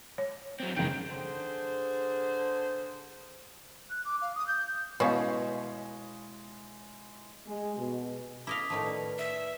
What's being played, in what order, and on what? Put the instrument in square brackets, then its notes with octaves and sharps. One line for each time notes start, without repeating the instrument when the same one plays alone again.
[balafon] C#5
[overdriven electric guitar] F#3 C4
[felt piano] F#1 D7 [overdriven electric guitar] D#3 G#3 [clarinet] G5
[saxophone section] D3 G#4 C5
[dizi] F#6
D6
F5
D#6
G6
[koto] B2 [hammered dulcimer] G#3 E4 [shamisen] C#4 B4 [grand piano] C#5 F5
[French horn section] G#3
B2
[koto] E4 D#5 F5 [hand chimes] D6 D#6 B6
[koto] A2 D#3 F3
[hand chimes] B4 D5
[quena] E5